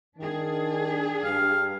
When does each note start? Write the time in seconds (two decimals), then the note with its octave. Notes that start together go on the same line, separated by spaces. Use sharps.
0.18 D#3 D4 G#4
1.24 G2 F5